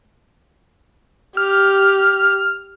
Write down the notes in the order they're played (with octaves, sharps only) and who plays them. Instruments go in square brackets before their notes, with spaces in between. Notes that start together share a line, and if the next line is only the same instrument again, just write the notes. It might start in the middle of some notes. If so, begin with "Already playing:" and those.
[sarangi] G4 [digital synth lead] F6